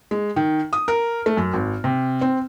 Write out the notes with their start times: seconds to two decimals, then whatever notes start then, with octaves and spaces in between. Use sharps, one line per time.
0.11 G#3
0.36 D#3
0.73 D#6
0.88 A#4
1.26 A3
1.37 F#2
1.54 G#1
1.84 C3
2.21 C4